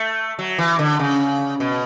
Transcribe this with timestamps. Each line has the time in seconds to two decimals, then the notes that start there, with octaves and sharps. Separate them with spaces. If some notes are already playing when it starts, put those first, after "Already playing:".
Already playing: A3
0.39 F#3
0.58 E3
0.79 D3
0.99 C#3
1.60 B2